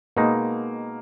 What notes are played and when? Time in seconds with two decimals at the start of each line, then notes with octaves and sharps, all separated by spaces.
0.16 B2 G#3 A#3 D#4